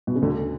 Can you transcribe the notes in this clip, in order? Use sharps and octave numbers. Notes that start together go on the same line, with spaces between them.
B2
C#3
D2 D3